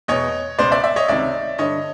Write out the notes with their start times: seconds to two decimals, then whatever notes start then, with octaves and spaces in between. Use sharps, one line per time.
0.08 E2 B2 C#5 D#5
0.58 C#2 B2 C5 D5
0.71 D5 E5
0.84 D5 E5
0.96 C#5 D#5
1.08 C#2 C3 D#3 D5 E5
1.58 G2 D3 C#5 D#5